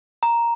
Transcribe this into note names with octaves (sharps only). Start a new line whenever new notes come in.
A#5